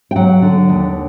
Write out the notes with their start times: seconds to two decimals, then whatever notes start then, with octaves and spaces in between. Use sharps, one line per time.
0.11 G5
0.16 F#3 F#5
0.42 D3
0.69 D#2